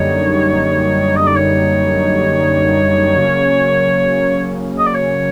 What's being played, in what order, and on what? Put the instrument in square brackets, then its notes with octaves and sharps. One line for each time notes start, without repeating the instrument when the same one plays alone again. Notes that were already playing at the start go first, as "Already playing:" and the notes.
Already playing: [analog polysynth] F#2 D3 G3 A#3 D#4 [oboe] C#5
[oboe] D#5
D5
C#5
[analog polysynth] C#3 F#3 A#3 C#4
[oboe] D#5
D5
C#5